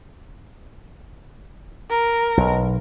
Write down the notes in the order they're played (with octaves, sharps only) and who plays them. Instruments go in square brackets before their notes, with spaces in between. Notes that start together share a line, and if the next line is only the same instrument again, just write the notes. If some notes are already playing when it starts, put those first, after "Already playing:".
[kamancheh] A#4
[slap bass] B1